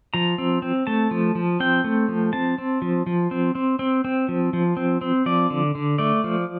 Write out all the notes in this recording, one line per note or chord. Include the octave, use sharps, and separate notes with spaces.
F3 A#5
C4
C4
A3 A5
F3
F3
C4 G5
A3
F3
C4 A5
C4
F3
F3
C4
C4
C4
C4
F3
F3
C4
C4
F3 D5
D3
D3
A3 D5
F3